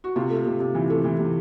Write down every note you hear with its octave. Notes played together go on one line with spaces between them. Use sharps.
F#4
C3 F4
A3
C3
C3
E3
A3
E3
C3